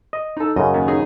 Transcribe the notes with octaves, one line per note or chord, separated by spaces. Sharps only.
D#5
D#4 A4
F#2 C#3 D#5
D#2
D#4 G#4